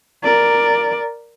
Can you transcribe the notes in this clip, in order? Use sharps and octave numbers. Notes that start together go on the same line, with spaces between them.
A#4 D5